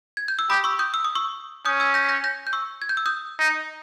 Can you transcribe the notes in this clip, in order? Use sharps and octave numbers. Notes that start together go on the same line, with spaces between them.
G#6
G6
E6
G4 B5 D#6
C#6 E6
D#6 G6
E6
D#6
C#6 E6
C#4 D#6 G6
E6 G#6
G6 A#6
B6
G6 A#6
G6 A#6
G6
C#6 E6
G#6
G6
E6
D#6 G6
D#4